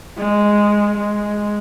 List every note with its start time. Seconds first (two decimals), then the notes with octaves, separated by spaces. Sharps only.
0.18 G#3
0.97 G#3